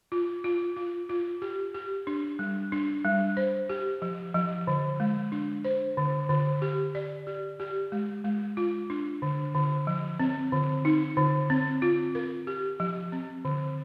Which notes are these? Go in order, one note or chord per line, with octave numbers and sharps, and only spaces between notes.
F4
F4
F4
F4
G4
G4
D4
G3
D4
G3
C5
G4
F3
F3
D3
G#3
D4
C5
D3
D3
G4
D5
G4
G4
G#3
G#3
F4
D4
D3
D3
F3
C4
D3
D#4
D3
C4
F4
A#4
G4
F3
C4
D3